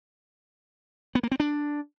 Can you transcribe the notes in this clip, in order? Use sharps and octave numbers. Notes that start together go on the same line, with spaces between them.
B3
A#3
C4
D4